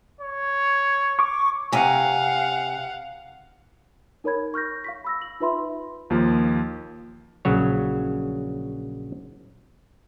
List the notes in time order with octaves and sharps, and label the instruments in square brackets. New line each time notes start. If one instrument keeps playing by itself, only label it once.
[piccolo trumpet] C#5
[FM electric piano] C#6 D6
[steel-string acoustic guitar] C3 G#5 [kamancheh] F5 F#5
[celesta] D#4 A#4 C#5 B5 G#6
C#6 F6 G6 A#6
F5 C#6 B6
B5 E6 A#6
F#7
D#4 F4 B4 E5 B5 C6
[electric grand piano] D#2 F3 A#3
[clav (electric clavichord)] A#1 C#3 F#3 C#5